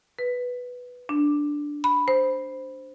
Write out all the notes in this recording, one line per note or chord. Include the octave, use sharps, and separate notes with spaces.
B4
D4
B5
C5